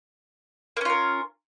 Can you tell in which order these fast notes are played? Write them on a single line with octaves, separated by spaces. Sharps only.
A#3 C#4 F4 A#4